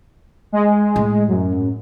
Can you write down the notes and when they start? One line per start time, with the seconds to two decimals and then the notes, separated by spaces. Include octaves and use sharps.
0.52 G#3
0.96 A2
1.28 F#2